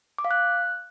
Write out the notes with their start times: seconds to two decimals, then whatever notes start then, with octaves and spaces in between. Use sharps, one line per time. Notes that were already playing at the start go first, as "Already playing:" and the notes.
0.18 D6
0.25 F5
0.31 F#6